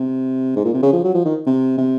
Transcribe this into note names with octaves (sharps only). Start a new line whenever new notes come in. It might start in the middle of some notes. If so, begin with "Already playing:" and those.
Already playing: C3
G#2
A#2
C3
C#3
F3
F#3
F3
D#3
C3
C3